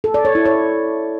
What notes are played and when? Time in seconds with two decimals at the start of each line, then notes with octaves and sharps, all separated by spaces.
0.04 A4
0.14 D5
0.25 C#5
0.35 E4
0.45 C#5